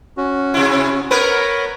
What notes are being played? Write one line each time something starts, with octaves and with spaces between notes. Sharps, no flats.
C#4 F#4
C3 E4
B3 A#4 B4 C#5 B5